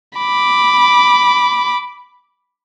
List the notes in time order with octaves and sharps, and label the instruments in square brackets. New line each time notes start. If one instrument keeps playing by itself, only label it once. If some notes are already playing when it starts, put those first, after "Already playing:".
[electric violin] B5 D6